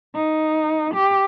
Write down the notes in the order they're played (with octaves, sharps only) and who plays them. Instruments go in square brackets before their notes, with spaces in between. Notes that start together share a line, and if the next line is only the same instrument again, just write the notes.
[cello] D#4
G4